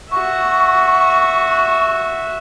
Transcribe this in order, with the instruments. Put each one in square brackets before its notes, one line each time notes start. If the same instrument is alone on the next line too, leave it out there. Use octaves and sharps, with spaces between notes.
[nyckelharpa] F#4 E5 [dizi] C#6